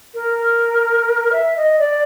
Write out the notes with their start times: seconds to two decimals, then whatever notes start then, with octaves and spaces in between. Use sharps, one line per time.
0.14 A#4
1.32 E5
1.56 D#5
1.79 D5